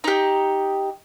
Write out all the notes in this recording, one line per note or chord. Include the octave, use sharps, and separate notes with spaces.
D#4 G4